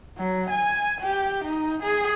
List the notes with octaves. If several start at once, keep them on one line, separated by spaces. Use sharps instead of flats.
F#3
G#5
G4
D#4
G#4